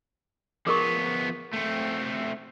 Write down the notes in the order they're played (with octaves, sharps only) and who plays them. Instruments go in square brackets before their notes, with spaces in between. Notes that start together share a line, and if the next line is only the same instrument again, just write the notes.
[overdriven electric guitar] F3 B3 [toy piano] G#4 A#4 C#6
[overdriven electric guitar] A3 C4